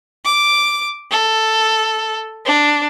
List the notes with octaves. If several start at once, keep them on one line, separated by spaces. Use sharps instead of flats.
D6
A4
D4